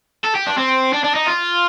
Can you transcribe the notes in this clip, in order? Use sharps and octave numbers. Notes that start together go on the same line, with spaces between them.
A4
G4
D4
C4
D4
D4
D#4
F4